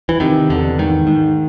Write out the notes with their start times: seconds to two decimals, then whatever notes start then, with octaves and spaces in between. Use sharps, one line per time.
0.09 E3
0.20 C3 D#3
0.50 E2 D3
0.78 G#2 D#3
1.07 G#2